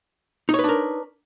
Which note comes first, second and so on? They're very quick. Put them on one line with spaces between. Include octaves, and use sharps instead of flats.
D#4 C#5 B4 D4 A#4